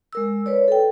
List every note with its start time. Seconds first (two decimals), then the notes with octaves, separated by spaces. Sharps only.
0.13 G#3 A#4 E6
0.46 B4 C#5 D5
0.68 A4 G5